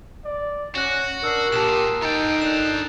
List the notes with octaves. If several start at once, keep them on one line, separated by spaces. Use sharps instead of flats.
D5
C#4 F#4 F#6 A#6
D4 A#4 E6 F6 C7
A#2 G4 A5 D#6 E7
D#4 A4 G5 A#5
D4 F#6 E7